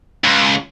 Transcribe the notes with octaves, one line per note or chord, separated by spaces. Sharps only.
C#2